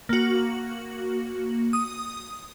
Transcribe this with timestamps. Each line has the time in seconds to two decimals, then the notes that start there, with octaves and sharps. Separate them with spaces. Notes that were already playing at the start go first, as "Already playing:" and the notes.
0.09 A#3 F#4
1.73 D#6